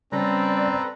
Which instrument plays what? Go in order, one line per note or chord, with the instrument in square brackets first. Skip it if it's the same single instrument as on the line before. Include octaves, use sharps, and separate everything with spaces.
[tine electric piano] C#3 G3 C#4 [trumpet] C4 [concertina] A4 B4 A#5 [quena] D5